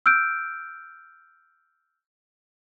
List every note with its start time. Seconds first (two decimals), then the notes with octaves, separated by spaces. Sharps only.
0.06 E6 F6 G6 D7